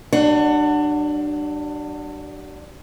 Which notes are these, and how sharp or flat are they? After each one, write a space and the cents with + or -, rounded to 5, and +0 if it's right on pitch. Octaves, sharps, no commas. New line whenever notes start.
G3 -40 D4 +25 F#5 +0